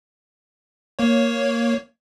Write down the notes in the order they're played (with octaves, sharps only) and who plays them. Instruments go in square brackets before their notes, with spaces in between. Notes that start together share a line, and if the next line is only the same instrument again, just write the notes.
[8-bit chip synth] A#3 C#5